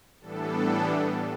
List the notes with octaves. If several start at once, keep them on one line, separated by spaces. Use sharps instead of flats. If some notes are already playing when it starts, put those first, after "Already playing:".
A2 E3 G3 B3 D4 A4